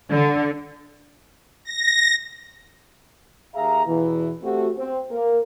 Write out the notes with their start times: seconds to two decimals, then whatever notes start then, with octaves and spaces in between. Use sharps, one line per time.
0.11 D3
1.64 A#6
3.55 D#2 G#4 E5 F5 A#5
3.87 E2 B2 E3
4.43 A3 C4 F#4 G4
4.77 C4
5.11 A#3 A#4